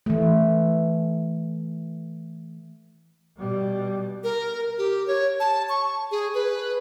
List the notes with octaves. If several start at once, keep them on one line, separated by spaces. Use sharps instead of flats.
E3 A3
B2 G3
A#4
G4
C#5
A5
C#6
G#4
B4